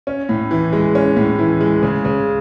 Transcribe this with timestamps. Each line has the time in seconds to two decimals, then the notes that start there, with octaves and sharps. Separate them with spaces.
0.07 C#4
0.29 A2
0.51 E3
0.73 G#3
0.95 C#4
1.17 A2
1.39 E3
1.61 G#3
1.82 C#3
2.05 C#3